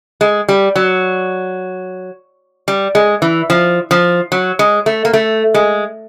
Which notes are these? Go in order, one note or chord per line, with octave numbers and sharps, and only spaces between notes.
G#3
G3
F#3
G3
G#3
E3
F3
F3
F#3
G#3
A3
A#3
A3
G#3